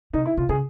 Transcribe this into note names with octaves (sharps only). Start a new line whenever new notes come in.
C3 D#4
E4
C3 F4
C#3 G#4